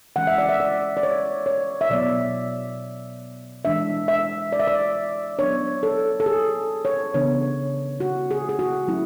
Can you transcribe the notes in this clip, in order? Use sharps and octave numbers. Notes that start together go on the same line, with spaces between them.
E3 G#3 C#4 F#5
E5
D5
E5
D5
D5
C#5
C#5
E5
B2 F#3 B3 D5
E3 G#3 D4 E5
E5
D5
E5
D5
F#3 B3 D4 C#5
A4
A4
G#4
C#5
C#3 E3 B3 D4 C#5
F#4
G#4
G#4
F#4
F#3 A3 C#4 E4